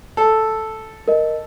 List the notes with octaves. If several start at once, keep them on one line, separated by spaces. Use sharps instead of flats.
A4
A#4 D#5